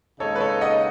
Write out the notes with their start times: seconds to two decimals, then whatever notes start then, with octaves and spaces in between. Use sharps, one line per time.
0.20 D#2 C#3 G#3 D#4 A4 C#5
0.35 B4
0.41 A4 C#5
0.61 D#5 F#5